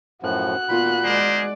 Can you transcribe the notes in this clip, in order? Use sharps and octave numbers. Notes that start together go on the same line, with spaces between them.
F#2 A2 F3 F#4 F#6
A#2 B3 F4 B5
G#3 G#4 A#4 C5 D5